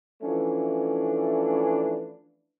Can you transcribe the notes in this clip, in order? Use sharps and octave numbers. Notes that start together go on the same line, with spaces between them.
E3 F3 A3 C#4 D4